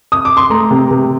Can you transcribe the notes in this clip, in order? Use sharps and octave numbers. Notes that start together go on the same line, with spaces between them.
D#6
D6
C6
A3 A#5
C3
C3